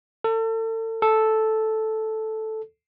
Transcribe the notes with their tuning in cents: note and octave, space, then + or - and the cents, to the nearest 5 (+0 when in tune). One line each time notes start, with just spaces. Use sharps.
A4 +35
A4 -5